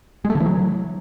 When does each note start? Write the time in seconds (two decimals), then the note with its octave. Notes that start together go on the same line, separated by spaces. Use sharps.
0.25 G#3
0.30 A3
0.35 D3
0.40 E3
0.46 F#3